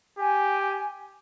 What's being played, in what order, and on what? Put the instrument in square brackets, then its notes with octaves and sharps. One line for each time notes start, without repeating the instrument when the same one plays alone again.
[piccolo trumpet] G4 [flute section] G#5